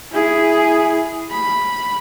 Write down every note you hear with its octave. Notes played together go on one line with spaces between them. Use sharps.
E4 G#4
B5